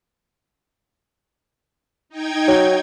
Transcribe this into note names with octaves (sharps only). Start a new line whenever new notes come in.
D#4 G5 G#6
F#3